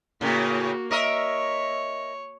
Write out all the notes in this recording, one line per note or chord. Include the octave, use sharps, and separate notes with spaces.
A2 C#3 A#3 F#4
A#4 C#5 D#5 E5